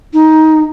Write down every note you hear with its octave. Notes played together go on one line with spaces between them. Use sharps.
D#4